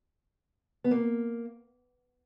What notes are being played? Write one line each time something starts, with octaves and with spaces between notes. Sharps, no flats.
B3
A#3